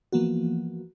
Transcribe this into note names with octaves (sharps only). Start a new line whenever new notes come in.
E3 F3 A#3 B3 F#4